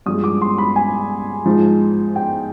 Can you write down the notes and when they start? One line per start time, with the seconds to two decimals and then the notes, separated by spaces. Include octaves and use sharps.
0.06 G2 F3 G#3 D#6
0.24 D6
0.42 C6
0.58 B5
0.76 G#5
1.46 G#2 F3 G#3
2.16 G5